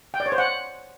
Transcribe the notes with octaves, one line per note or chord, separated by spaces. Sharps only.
G5
D5
C#5
C5
F#5